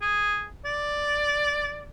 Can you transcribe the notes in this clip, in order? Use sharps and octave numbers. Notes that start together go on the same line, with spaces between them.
G#4
D5